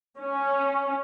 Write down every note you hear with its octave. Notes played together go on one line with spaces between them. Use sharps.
C#4